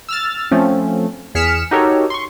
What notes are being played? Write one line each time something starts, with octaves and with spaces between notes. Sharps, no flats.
E6 F6 A6
F3 A3 C4 C#4
E2 G#4 F6 B6 C#7 E7
D#4 F#4 G4 A4 A#4 C#5
C6 C#6